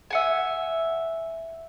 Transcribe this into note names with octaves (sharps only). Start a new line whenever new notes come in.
E5 F#5 G#5